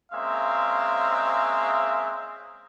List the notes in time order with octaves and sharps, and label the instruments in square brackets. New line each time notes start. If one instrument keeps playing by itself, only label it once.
[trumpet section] G#3 A#3 C4 C#4 E5 F5